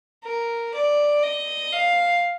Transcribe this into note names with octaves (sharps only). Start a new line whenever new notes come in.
A#4
D5
D#5
F5